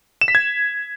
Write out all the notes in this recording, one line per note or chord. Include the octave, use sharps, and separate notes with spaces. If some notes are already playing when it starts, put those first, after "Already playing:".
E7
B6
G#6